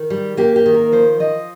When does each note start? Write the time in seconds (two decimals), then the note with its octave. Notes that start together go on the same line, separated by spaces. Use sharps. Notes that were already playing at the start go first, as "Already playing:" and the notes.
Already playing: D#3
0.10 G3
0.37 A#3 G4
0.56 G4
0.66 D#3
0.74 A#4
0.92 F3 C5
1.20 F3 D#5